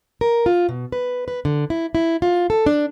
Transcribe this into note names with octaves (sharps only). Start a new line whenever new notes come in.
A#4
F4
B2
B4
B4
D3
E4
E4
F4
A4
D4